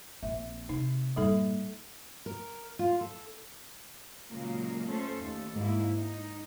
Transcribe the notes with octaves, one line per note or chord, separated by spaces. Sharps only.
A#1 C4 E5
C3 D#4
G2 A#2 G3 D#4 A4
A#4
F4
A4
A#2 C#3 F#3 G#3 A#3
A3 C#4 A4 C5
D#2 A3 A4
G#2 A#3 E4
D#4